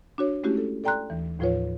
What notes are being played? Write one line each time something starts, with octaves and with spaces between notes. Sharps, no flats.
D4 F#4 C#5
G#3 A3 C#4 E4 F#4 G4
A4
A4 D5 G5 A#5 C6 F#6
D#2 E3
D#2 A2 F3 F4 B4 C#5